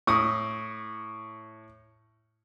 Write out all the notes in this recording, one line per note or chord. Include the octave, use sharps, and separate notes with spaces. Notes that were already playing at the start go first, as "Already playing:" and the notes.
A2 C#6 D#6